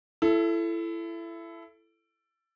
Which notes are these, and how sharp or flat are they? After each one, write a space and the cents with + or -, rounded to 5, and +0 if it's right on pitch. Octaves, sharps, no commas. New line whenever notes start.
E4 +25 A4 -5